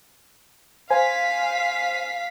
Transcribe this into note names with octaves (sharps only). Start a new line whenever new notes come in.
C5 F5 G#5 B6